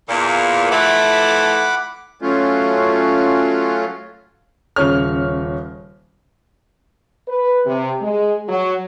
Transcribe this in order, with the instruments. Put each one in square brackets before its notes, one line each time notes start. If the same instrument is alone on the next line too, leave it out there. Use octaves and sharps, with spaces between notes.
[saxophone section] E2 A#2 [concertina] A#4
[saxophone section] E3 F3 A3 [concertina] F#5 B5 D6
[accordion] F#3 A3 C#4 F4
[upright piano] D#1 C#3 C#5 F6
[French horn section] B4
C3
G#3
F#3